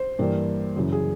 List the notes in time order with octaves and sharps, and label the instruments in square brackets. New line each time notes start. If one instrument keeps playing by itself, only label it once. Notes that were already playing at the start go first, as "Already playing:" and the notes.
Already playing: [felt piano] C5
G2 E3 G3 A#3
F#2 C#3 E3
G#4